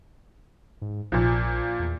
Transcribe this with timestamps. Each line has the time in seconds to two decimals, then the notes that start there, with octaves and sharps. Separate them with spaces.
0.82 G#2
1.12 A#1 A#2 F3
1.79 E2